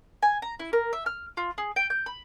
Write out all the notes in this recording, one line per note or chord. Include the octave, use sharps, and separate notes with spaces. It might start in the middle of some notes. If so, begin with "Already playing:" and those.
G#5
A#5
E4
A#4
E5
F6
F4
G#4
G5
G6
B5